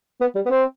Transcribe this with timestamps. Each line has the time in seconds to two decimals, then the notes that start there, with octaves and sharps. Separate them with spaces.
0.21 B3
0.35 G3
0.45 B3
0.50 C4